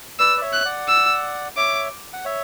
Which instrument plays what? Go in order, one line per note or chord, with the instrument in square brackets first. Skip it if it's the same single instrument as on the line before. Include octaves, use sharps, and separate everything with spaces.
[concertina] B4 D5 [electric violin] E6
[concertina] D5
C#5 E5
[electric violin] F#6
[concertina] D5 F#5
[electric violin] E6
[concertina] C#5 E5 [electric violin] D6
[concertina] F#5
C#5 E5